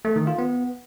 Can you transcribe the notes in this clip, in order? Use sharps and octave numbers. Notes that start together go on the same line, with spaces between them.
A3
D#3
F4
B3